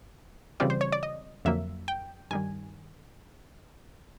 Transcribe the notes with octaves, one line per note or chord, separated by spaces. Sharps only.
C#3 E3 G3 C4 F4 D5
C5
C#5
D5
D#5
F2 D3 F#3 A#3 E5
G5
G2 D#3 G3 G#5